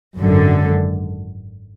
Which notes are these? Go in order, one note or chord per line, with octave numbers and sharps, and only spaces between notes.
G#1 F#2 D3